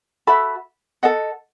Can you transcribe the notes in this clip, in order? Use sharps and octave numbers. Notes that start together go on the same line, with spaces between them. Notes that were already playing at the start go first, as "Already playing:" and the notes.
F#4 A4 E5 B5
A4 D#5 F#5